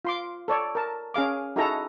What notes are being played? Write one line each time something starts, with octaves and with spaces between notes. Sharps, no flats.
F4 C6 D6
A4 C#5 D5
A#4 A5
C#4 G#4 F5 D6
D#4 E4 F#4 G#4 A4 A#5